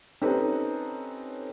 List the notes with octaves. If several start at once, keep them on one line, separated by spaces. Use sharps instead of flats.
C4 C#4 D#4 G4 A4 B4